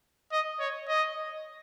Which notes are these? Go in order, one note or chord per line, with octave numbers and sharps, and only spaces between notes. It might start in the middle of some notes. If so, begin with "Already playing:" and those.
D#5
C#5
D#5